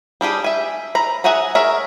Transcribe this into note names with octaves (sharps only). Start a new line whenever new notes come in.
G3 D4 G4 G#4
E5 G#5
A#5 B5
G#4 E5 F#5 G#5 A#5
G#4 A#4 C#5 E5